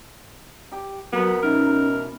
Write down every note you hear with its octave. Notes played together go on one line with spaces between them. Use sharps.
G4
F#3 B3 F#4 A#4 B4
B2 B3 C#4 D#4 E4 A#4